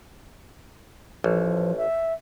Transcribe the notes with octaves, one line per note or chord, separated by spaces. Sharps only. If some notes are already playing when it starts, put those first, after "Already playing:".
A1 F3
E5